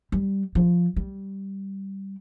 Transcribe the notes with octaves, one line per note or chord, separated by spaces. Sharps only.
G3
F3
G3